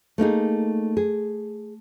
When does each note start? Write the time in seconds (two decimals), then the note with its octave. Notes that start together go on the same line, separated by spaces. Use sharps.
0.18 A3 A#3 D#4 G#4
0.97 G#4